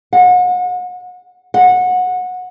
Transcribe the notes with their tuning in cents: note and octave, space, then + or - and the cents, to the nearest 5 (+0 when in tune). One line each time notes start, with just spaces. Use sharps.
F#5 -35
F#5 -20